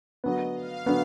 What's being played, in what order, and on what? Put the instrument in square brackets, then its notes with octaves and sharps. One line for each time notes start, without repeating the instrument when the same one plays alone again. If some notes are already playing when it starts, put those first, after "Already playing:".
[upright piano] D3 F#3 B3 [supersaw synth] D#5
[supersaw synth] F5
[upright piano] D3 F#3 B3